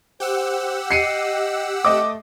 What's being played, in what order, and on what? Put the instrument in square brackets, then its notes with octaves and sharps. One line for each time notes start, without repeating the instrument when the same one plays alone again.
[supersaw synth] G4 F#5 E6 [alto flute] C5
[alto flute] D#5 [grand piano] C7 C#7 D#7
[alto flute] A3 [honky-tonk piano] D#5 D6